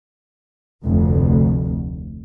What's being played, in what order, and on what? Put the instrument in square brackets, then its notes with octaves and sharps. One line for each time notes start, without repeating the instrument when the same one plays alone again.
[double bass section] F1 D2